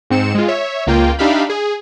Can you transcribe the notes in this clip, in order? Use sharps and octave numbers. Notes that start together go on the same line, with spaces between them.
G#2 C4 C#7 E7
G#3 F4
C#5 E5
C#2 A#3 F4 G5
D4 D#4 G4 E5 F5 B5
G#4